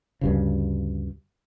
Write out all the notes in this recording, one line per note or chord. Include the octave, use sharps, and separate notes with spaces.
D2 G2 C#3